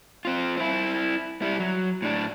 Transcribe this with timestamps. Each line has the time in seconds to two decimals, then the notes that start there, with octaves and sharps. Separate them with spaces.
0.25 C4 F4
0.57 C4 E4
1.42 G3 E4
1.60 F#3
2.02 A2 D4